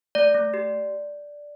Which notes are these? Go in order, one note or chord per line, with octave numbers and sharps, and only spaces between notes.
A3 D5
A3
G4